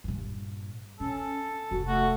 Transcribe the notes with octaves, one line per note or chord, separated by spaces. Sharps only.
G2 A#2
B2 C#4 A4
F1 D2 F#4
A3 F#4